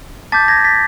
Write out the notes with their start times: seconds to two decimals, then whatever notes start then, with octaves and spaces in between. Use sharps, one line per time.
0.32 A5 D6 G6 A6 B6
0.48 G#6 A#6
0.64 A6 B6